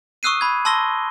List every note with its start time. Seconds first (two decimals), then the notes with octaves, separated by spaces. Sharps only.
0.23 C#6 D#6 E6 F#6 C7 D#7
0.41 B5 G#6
0.65 A5 C6 E6 A#6 G7